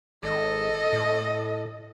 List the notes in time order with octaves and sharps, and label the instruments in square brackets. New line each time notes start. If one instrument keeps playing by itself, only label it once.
[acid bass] G#1 [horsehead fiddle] A4 D#5
[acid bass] A2